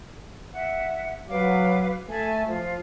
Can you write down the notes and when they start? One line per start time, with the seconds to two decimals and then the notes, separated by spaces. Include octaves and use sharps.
0.53 E5 F#5
1.29 F#3 B4 F5 D6
2.09 A3 E5 G#5 A5
2.47 F3 F4